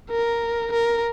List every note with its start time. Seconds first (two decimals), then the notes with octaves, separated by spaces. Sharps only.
0.10 A#4
0.73 A#4